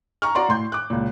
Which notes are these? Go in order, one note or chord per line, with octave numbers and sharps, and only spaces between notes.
A#5 C#6 F6
F#4 D5 A#5 C6
A2 C6 G6
D6 F#6
C#2 A#2